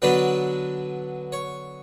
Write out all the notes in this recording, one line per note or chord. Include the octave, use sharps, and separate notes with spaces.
D3 F#3 B3 D4 B4
C#5